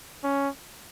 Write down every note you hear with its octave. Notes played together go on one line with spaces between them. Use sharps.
C#4